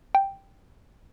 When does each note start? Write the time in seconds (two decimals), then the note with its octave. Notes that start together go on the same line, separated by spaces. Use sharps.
0.15 G5